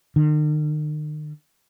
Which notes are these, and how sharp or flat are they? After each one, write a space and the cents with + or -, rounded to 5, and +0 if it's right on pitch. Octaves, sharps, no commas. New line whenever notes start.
D#3 -45